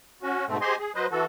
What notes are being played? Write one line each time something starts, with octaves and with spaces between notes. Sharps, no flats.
C#4 F#4
G#2 B2 A3 C4
G4 G#4 C5 D#5 G#5 C6
G#4
F#3 B4 C5 D#5
E3 F#4 A4